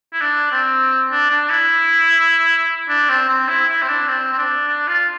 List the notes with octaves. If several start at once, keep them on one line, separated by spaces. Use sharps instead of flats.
E4
D4
C4
D4
D4
E4
D4
C4
C4
E4
E4
C4
D4
C4
C4
D4
D4
F4